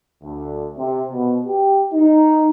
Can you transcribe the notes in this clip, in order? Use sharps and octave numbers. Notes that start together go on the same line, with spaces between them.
D2
C3
B2
G4
D#4